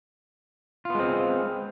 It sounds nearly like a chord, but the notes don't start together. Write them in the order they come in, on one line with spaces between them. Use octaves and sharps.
F4 B3 G#3 C4